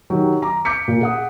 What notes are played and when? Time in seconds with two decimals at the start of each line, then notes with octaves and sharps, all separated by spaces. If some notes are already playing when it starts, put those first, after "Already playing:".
0.10 D#3 F#3 G4
0.42 A#5 D6
0.65 D6 G6 B6 C#7
0.88 A#2
1.01 G#4 F#5 D#6